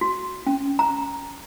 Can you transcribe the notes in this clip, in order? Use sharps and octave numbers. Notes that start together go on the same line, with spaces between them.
F#4
C#4
A#5